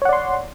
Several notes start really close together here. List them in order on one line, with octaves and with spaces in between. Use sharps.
C#5 F#5 D5 C6